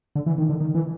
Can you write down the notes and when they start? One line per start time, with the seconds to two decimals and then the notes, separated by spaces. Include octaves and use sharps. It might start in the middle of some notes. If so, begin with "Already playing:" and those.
0.15 D3
0.26 E3
0.38 D#3
0.49 D3
0.61 D#3
0.75 E3